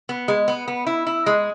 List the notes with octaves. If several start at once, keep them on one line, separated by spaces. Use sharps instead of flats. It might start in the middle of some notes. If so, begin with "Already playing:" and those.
B3
G#3
B3
B3
E4
E4
G#3